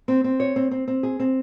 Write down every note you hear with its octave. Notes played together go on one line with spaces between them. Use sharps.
C4
C4
C#5
C4
C4
C4
G#4
C4